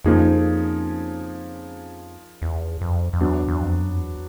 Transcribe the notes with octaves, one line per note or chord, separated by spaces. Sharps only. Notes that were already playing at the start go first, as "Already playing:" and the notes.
F2 C#3 F3 A#3 D#4 G#4
E2
F2
F2
E2 F#3 B3 D4
E2
F2
F#2
F2
E2